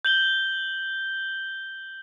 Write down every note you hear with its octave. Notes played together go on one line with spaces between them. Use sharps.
G6 F#7 G7